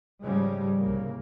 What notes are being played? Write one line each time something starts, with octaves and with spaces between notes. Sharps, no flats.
G#2 C#3 F3 G3 G#3
C2 C#3 A#3